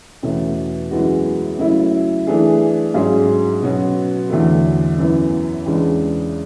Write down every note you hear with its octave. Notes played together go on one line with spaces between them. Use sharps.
E2 B2 A3 C#4
F#2 E3 G#3 B3 F#4
C#3 F#3 A3 E4
E3 A3 D4 G#4
G#2 F#3 C#4 G#4
B2 F#3 C#4 F#4
E2 D3 F#3 A3
F#2 E3 B3
E2 C#3 G#3 D4